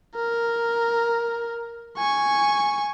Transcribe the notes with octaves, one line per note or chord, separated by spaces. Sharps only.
A#4
G#5 C#6